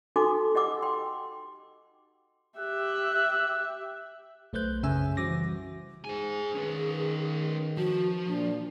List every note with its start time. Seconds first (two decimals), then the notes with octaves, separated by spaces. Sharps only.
0.16 D#4 F#4 A4 G#5 C6 D6
0.55 G4 D#5 F#5 D6 E6
0.82 G5 C6
2.59 G4 E5 F#6
4.53 B1 A3 B4 C5 F#6 G6
4.83 F#2 C#3 C#4 E5 G#5 E6
5.17 E3 G3 F#4 C5 D6 A#6
6.05 G#2 G#4 C5 G#5
6.56 D#3 C#4 B4
7.77 F3 F#4
8.27 A#2 D4